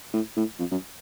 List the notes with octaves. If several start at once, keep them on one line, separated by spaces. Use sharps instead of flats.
A2
A2
F2
F#2